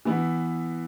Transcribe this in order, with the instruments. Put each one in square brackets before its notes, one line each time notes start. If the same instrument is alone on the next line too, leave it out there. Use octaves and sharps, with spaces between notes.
[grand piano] E3 B3 E4